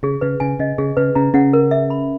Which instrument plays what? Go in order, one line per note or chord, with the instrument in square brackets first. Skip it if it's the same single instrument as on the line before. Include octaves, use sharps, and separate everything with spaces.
[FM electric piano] C#3 [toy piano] G#4
[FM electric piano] C#3 [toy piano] B4
[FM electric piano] C#3 [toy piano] G#5
[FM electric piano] C#3 [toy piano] D#5
[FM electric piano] C#3 [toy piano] G#4
[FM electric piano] C#3 [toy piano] B4
[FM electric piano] C#3 [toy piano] A#5
[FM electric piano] C#3 [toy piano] F#5
[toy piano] A#4
E5
B5